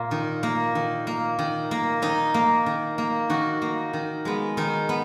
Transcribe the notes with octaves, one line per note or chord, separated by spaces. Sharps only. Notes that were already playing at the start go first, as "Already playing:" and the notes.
Already playing: A#2 A#3 F4
D#3
A#3
D#3
A#3
D#3
A#3
D#3 D#4
A#3
D#3
A#3
D#3 F#4
A#3
D#3
G#3 B3
D#3 D#4
B3